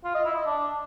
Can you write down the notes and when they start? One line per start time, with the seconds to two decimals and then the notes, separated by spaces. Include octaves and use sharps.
0.04 F4
0.15 D#5
0.25 E4
0.36 D#5
0.46 D4